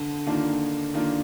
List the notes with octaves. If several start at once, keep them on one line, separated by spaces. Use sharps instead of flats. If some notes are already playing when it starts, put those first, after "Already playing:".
Already playing: D3
D#3 A#3 D4 F4
D#3 A#3 D4 F4